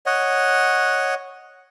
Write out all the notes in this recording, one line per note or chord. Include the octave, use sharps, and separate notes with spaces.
C#5 D#5 F#5